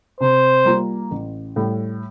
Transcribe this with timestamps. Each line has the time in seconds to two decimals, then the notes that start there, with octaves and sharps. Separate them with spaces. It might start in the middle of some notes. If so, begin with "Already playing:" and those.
0.21 C3 C5
0.65 G3 A#3 F4
1.11 A1
1.56 A2 G3